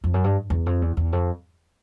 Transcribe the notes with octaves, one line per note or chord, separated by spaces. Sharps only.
F2
F#2
G2
E2
F2
E2
E2
F2